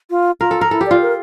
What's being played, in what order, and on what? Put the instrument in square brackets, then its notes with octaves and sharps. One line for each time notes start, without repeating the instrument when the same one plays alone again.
[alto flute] F4
[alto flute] F4 [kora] A#4
[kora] A4
A#4
[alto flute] E4 [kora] A4
[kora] G4
[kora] F4 [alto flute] D5
[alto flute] A#4